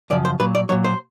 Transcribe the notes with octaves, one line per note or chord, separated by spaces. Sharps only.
F#2 C#3 F3 D5
C5
A#2 F#3 B4
D5
A#2 F#3 C#5
C5